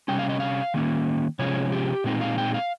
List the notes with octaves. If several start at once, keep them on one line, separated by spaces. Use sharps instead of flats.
C3 G3 C#4 G5
F5
D#5
F5
D#3 A#3 C#4
C3 F3 G#3 C#4 C#5
G4
A#2 G#3 C4 D#4
F5
G5
F5